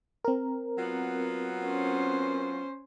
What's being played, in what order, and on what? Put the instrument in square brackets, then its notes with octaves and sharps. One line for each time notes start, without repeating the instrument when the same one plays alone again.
[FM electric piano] C4 A#4
[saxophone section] F#3 B3 F4
[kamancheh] C#4 C5